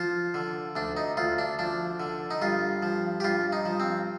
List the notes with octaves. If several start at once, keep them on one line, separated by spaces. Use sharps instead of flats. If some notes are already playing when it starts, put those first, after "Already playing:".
Already playing: F3 F4
D3
D2 D4
D#4
D2 F4
D4
F3 D4
D3
D#4
G2 F4
F3
G4
G2 F4
D#4
F3
C4